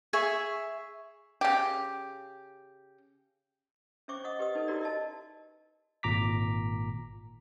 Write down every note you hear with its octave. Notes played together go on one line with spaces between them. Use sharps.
G#4 E5 C#6
C#3 G4
C#4 C5 E5 C#6 D6
D#5 F#5 C#6 D#6
G4 B4 D#5 D#6
D#4 A4 B4
D#4 E4 F#4 G4 A#4 D5
D#5 E5 A5
G#1 A#2 A#5 D6 B6